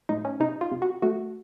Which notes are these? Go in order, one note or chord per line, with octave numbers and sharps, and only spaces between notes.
A2 D#4
C#4
C3 D#4
F4
C3
F#4
A3 F#4